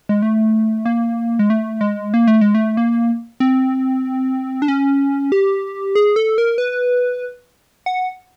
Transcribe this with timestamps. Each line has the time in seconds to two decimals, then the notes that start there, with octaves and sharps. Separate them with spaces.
0.09 G#3
0.22 A3
0.85 A#3
1.39 G#3
1.50 A3
1.81 G#3
2.14 A#3
2.28 A3
2.41 G#3
2.55 A3
2.77 A#3
3.40 C4
4.62 D4
4.68 C#4
5.32 G4
5.95 G#4
6.16 A4
6.38 A#4
6.58 B4
7.86 F#5